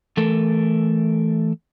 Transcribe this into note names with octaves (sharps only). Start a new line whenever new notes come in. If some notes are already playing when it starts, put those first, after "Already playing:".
E3 A3 A4 A#4